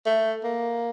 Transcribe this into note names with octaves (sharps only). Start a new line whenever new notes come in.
A3
A#3